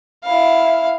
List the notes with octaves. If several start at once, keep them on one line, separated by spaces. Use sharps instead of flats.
E4 F5